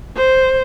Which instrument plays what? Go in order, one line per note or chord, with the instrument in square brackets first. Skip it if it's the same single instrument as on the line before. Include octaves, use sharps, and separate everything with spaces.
[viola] C5